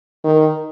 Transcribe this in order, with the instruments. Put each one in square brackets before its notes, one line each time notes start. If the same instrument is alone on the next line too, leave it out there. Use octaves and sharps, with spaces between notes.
[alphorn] D#3